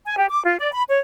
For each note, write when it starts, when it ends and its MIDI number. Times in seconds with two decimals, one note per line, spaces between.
0.05 0.17 80
0.18 0.28 67
0.30 0.41 86
0.44 0.58 65
0.59 0.71 74
0.72 0.83 83
0.89 0.98 73